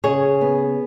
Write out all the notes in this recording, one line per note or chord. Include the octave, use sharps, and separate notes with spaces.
C#3 G#4 C#5
B3